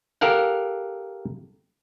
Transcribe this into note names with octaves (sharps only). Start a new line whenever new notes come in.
G4 A4 A#4 F5 F#5